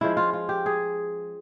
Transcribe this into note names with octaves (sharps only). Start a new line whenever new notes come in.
F3 G#3 C#4 E4
F4
F4
G4
G#4